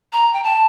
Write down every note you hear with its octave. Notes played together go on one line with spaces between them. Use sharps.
A#5
G5
A5